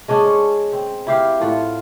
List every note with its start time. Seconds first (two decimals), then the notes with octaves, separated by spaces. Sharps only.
0.08 G#3 C#4 D4 G#4
0.25 C#5
0.72 C4
1.07 E4 G4 F5
1.40 A2 F4 F#5